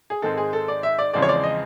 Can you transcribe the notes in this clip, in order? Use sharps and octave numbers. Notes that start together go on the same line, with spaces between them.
G#4
G#2 D#3 G#3 C4 A4
G#4
A4
D5
E5
D5
E2 C#3 F3 G#3 C4 D5
C#5
D5
D#5